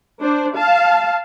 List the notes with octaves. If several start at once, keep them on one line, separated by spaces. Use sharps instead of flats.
D4 C5
F5 A5